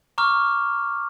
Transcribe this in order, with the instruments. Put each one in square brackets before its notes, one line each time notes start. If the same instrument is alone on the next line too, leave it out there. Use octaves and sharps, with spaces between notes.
[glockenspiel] A#5 C#6 D6 F6